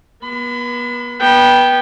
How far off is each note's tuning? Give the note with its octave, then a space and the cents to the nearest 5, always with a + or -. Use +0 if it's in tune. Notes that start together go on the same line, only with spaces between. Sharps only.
B3 -40 B5 +35
B3 -20 G5 +0